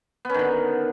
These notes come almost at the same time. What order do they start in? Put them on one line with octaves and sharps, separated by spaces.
B3 C#4 D#3 D3